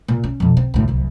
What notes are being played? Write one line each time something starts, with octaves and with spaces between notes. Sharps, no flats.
A#2
C#4
F2 B2
C4
D2 A2
D1 C2